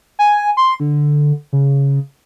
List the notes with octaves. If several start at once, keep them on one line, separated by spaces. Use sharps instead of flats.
G#5
C6
D3
C#3